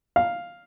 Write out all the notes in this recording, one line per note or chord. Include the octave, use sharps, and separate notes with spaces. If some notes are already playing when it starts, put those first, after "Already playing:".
F5